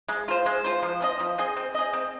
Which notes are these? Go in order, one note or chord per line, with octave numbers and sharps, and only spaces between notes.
G#3
F4 C5
G#3
F4 C5
F3
C4 G#4 D#5
F3
C4 G#4 D#5
C4
G#4 D#5
C4